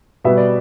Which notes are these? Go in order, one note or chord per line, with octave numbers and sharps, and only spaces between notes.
B2 G3 B3 E5
D5